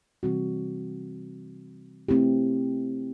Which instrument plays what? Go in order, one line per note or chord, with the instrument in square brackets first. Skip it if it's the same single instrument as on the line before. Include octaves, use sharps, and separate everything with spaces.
[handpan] C3 E3 G3 C4 F#4
A3 C4 E4 G4